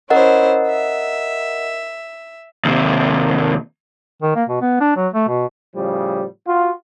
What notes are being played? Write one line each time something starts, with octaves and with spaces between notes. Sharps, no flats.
C#4 E4 A#4 C5 D#5 F#5
E5
D#2 C3
D#3
A#3
B2
B3
D4
F#3
A3
B2
A2 C#3 F3 G3
F4 F#4